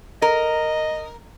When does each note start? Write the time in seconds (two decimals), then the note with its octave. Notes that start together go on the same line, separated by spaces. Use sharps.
0.22 A#4 D#5